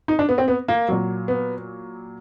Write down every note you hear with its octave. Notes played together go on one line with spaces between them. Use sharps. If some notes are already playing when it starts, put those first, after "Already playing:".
D#4
D4
B3
C4
B3
A#3
A#2 F#3
B3